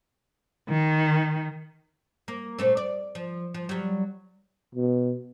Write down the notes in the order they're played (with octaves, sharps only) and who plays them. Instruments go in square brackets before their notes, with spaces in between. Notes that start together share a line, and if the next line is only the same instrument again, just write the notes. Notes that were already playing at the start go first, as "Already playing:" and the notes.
[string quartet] D#3
[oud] A#3
A#2 A3 C4
D5
F3
F3
F#3 G3
[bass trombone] B2